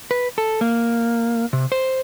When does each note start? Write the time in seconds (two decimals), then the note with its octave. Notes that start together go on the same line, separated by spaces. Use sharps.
0.11 B4
0.38 A4
0.61 A#3
1.53 C3
1.72 C5